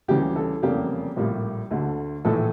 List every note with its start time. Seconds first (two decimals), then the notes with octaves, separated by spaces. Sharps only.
0.08 D2 C#3 E3 G3 G4
0.36 A4
0.62 F1 E2 C#3 G3 A#3 G4
1.16 A#1 A2 G3 A#3
1.71 D2 D3 A3
2.25 A#1 A2 E3 A4